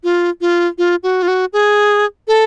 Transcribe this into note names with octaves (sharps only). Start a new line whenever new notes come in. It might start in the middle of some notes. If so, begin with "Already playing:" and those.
F4
F4
F4
F#4
F4
F#4
G#4
A4